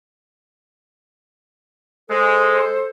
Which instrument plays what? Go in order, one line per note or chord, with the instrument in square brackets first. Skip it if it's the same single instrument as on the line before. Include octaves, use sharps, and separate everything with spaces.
[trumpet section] G#3 [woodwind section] A4 C5